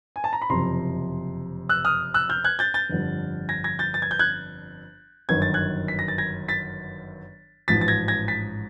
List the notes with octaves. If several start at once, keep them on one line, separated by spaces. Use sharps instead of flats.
G#5
A5
A#5
B5
F#1 F2 C3 A#5 C6
E6 F#6
D#6 F6
E6 F#6
F6 G6
F#6 G#6
G6 A6
G6 A6
G1 F2 D3 G3
G#6 A#6
G#6 A#6
G6 A6
A6
G#6
G6
F#6 G#6
G1 F#2 D#3 G#6
A6
F#6 G#6
B6
A#6
A6
G#6 A#6
A6 B6
A1 G#2 F3 A6 B6
A6
G#6 A#6
G#6 A#6
A6 B6